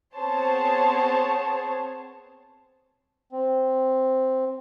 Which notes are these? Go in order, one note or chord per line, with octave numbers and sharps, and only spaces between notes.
B3 C4 G#4 C5 C#5 A5
C4